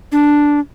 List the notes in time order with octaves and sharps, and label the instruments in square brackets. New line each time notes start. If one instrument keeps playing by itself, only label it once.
[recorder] D4